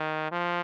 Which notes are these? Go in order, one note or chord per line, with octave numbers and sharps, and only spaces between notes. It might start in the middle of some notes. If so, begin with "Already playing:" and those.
Already playing: D#3
F3